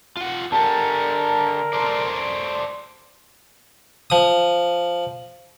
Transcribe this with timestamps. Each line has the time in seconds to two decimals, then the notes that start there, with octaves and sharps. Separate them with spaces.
0.17 F4 F#5
0.52 D3 G4 A4 A#4 A5
1.73 A4 C5 D5
4.10 F3 D#6